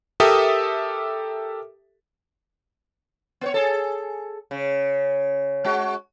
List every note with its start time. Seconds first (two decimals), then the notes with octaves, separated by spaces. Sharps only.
0.20 G4 A4 A#4 E5 D#6
3.41 B3 C5 C#5
3.54 G#4 A4
4.51 C#3
5.64 G#3 F#4